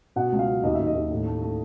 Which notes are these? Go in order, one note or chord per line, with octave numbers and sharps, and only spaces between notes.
B2 F#5
C#2
F5
F#3
D#2 D#5
D#2 E5
D#5
D#2
A2
A3
A3